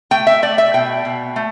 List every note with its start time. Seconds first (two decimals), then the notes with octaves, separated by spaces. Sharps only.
0.11 A3 G5
0.27 E5
0.42 A3 D5
0.58 E5
0.74 B2 G5
1.05 B2
1.36 A3